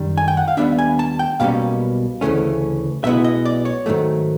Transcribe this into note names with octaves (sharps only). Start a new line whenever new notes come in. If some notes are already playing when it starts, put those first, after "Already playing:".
Already playing: F#2 D#3 G3
G#5
G5
F#5
F5
D#2 D#3 G3 B3 D4 E5
G#5
A5
G5
B1 B2 G3 A#3 C#4 F5
D2 C#3 E3 A3 C#4
B1 B2 G#3 B3 E4 E5
D#5
D5
C#5
G#2 D#3 F#3 A3